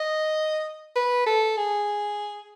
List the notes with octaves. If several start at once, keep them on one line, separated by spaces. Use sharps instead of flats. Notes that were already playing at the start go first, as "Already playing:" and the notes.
Already playing: D#5
B4
A4
G#4